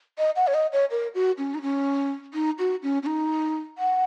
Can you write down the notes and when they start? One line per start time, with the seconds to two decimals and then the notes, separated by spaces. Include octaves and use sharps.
0.18 D#5
0.36 F#5
0.47 C#5
0.54 D#5
0.72 C#5
0.91 A#4
1.14 F#4
1.38 C#4
1.54 D#4
1.62 C#4
2.34 D#4
2.58 F#4
2.82 C#4
3.02 C#4
3.06 D#4
3.78 F#5